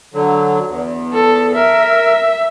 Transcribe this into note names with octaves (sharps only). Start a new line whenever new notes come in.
D3 F#3
E2
A4
A#4 E5